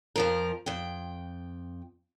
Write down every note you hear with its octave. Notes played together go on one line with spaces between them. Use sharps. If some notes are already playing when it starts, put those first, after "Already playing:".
F2 F3 A#4
F2 G5